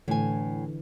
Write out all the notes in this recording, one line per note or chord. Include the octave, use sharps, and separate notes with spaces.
A2 D3 E3 G#5